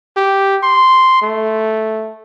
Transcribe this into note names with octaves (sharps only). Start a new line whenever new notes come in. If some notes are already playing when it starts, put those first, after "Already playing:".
G4
C6
A3